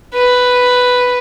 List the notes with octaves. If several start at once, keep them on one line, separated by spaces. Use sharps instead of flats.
B4